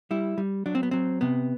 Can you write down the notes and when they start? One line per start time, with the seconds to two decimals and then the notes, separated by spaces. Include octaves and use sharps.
0.11 G3 E4
0.38 G3
0.66 F#3 D4
0.75 C4
0.83 B3
0.91 F#3 C4
1.21 C3 B3